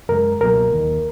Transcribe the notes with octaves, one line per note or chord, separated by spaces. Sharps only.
F#2 C#3 G#3 A#4
C#2 B2 F#3 A#3 A#4
D#2 D#3 A#3